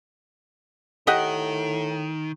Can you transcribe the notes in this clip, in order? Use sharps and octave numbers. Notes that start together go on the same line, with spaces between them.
A2 D#3 G4 D#5 F#5